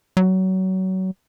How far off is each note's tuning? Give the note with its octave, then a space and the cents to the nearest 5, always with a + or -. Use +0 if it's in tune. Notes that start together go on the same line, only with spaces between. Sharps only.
F#3 +25